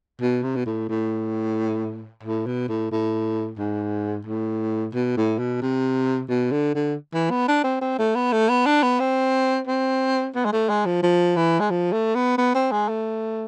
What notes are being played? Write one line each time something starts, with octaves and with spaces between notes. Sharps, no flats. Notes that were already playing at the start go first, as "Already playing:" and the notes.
B2
C3
B2
A2
A2
A2
B2
A2
A2
G#2
A2
B2
A2
B2
C3
B2
D3
D3
E3
B3
D4
C4
C4
A3
B3
A3
B3
D4
B3
C4
C4
B3
G#3
A3
G#3
F3
F3
E3
G#3
F3
A3
B3
B3
C4
G#3
A3